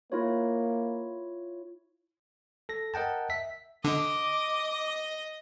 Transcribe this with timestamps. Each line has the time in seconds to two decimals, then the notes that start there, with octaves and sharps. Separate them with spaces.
0.12 A#3 E4 F4 C#5
2.69 A4 A#6
2.94 A#4 D#5 F#5 G5 A5
3.30 E5 B6
3.84 D3 D#5 D6